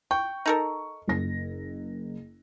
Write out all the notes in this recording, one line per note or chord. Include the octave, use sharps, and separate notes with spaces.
G5 C#6
D#4 A4 A#4
F#1 A#6